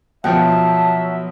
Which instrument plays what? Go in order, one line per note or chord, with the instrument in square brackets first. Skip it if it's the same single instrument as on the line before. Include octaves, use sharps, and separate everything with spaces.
[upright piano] B2 F3 [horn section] F#3 E5 [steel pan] F#5 G5 [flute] A5